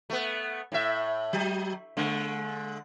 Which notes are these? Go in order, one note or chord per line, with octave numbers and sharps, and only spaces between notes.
A3 B3
A2 E5
F#3
D3 G#3